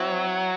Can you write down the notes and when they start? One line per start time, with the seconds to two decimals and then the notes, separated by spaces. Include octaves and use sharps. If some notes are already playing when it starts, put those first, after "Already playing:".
Already playing: F#3 C4 E4